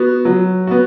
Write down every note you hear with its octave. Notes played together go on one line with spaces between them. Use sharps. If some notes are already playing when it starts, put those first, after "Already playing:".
Already playing: B3 F#4
F#3
B3 F#4